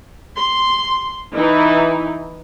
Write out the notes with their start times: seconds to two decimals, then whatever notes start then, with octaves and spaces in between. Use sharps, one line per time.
0.38 C6
1.35 E3 D#4 E4